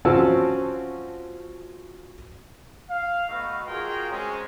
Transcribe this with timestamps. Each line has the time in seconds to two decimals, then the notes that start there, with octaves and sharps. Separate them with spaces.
0.05 F3 C4 C#4 F#4 A5 E6
2.90 F5
3.29 A3 B3 D#4 F#4 F5
3.67 F4 F#4 G#4 A#4 D#5 G5
4.11 G#3 C4 C#4